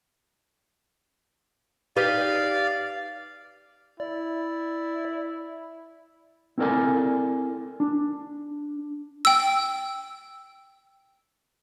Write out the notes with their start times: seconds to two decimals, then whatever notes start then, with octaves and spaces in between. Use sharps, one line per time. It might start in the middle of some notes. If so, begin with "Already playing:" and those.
1.96 D#4 G4 B4 D5 F5
4.00 E4 D5
6.58 C4 E4 A4 A#4 D5 G#5
7.80 D4
9.25 G5 E6